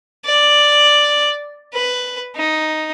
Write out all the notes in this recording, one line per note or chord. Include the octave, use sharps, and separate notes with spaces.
D5
B4
D#4